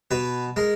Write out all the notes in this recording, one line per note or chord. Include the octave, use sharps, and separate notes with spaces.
B2 B4
G#3 A#4